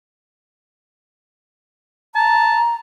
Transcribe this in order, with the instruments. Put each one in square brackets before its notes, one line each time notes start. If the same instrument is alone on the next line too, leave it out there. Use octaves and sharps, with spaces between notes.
[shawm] A5 [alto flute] A#5